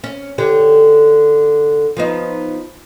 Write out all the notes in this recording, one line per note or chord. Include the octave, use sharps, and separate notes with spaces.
C#4
D3 G4 C#5
F3 B3 D#4